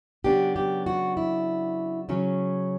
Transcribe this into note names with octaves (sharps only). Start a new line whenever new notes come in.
C#3 F#3 B3 D4 G4
G4
F#4
E4
C#3 F#3 C#4